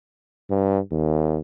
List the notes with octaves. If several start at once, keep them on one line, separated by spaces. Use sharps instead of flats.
G2
D#2